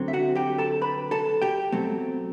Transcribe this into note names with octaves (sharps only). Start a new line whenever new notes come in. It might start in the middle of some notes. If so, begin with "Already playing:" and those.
Already playing: D2 D3 F#3 C4
E5
F#4 F#5
G4 G5
A4 A5
B4 B5
A4 A5
G4 G5
B2 F#3 A3 C4